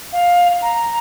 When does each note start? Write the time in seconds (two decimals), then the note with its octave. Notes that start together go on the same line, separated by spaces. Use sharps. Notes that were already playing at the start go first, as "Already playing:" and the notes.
0.12 F5
0.62 A#5